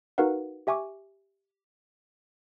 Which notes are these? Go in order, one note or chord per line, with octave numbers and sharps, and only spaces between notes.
D#4 F#4 A#4 B4 F5 F#5
G4 E5 G#5 C#6 D6